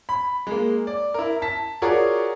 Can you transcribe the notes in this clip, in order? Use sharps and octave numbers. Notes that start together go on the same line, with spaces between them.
B5
G#3 A#3
D5
E4 A#4
A5 B6
F4 F#4 G#4 A#4 C#5 D5